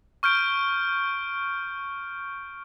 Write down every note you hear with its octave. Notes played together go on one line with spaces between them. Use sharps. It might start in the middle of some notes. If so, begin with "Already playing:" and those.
C#6 F6 G6 D7